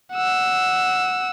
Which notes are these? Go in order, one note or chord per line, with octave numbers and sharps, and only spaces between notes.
F#5 E6